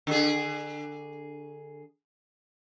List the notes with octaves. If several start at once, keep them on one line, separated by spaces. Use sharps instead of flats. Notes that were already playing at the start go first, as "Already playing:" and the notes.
D3 G#4